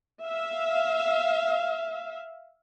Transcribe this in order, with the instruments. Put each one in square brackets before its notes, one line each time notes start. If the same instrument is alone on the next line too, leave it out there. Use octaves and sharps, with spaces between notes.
[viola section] E5 F5